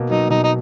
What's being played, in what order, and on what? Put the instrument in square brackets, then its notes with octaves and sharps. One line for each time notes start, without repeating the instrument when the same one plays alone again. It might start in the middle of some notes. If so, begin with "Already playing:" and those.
Already playing: [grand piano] B2 A#3
[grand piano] F#3 [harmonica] D#4
[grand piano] B2 [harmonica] D#4
[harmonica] D#4